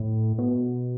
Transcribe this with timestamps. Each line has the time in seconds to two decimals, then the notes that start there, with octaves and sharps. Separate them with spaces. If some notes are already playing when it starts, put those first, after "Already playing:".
Already playing: A2
0.38 B2